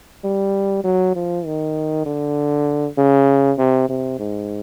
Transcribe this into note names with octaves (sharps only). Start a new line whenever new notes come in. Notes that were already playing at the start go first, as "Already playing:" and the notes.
G3
F#3
F3
D#3
D3
C#3
C3
C3
G#2